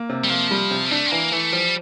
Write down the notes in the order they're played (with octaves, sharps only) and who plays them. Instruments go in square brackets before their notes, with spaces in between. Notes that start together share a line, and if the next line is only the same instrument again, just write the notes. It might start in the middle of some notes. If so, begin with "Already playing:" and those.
Already playing: [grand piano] A#3
C3
[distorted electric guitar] G3
[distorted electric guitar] F3 [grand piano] A#3
[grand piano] G3
C3
[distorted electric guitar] G3
[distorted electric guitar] A3 [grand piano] D4
[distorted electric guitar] C4
[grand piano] E3 [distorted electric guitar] A#3
[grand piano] E3 [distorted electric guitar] A3
[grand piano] F3 [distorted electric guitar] G3